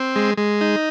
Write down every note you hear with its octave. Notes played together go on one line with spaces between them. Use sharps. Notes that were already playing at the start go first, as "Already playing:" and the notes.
Already playing: C4
G#3
G#3
D#4